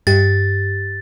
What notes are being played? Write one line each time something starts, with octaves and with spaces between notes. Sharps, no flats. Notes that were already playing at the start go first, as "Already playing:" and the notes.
G2 G4 A6